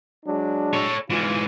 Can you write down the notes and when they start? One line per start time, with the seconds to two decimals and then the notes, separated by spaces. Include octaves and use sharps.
0.25 F#3 G#3 D4
0.73 A4 C#5
1.10 G#2 E3 F4